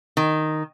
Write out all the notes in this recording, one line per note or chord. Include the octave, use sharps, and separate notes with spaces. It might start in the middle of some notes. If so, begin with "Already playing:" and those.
D#3